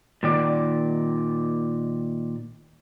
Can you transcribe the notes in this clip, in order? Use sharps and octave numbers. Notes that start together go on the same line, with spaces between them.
A#2 D#3 D5